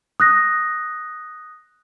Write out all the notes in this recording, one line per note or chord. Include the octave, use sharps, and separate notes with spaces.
D#6 F#6 A#6